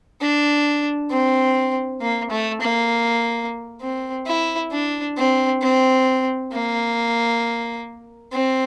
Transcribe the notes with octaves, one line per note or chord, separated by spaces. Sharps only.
D4
C4
A#3
A3
A#3
C4
E4
D4
C4
C4
A#3
C4